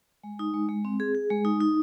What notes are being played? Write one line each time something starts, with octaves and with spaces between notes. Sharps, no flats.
G#3
D#4
G#3
G#3
C4
G#4
G#4
G#3
D#4
D#4